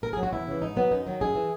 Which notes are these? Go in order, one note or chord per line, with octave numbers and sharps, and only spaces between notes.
A#2 A#4
F#3 G#4
F#4
E2 E4
C#3 E3
G#2 D#4
F#3 B3
F#2 D#4
D#3 F#3
F#2 G#4
E3